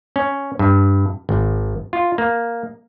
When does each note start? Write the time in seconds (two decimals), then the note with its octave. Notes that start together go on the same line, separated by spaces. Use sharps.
0.16 C#4
0.59 G2
1.29 G#1
1.93 F4
2.18 A#3